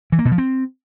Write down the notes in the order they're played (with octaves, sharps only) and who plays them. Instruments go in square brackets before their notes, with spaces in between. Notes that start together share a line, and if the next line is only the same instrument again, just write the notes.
[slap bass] E3
A#3
B2
F3
C4